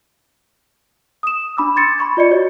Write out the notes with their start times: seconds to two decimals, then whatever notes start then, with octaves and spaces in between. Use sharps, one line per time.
1.23 D#6 E7
1.57 D4 B5 D6 E6
1.76 C6 G#6 A6 C#7
1.98 B5 C#6 G#6
2.17 F4 D5 D#5 C#7
2.30 F#4 C#5 D#5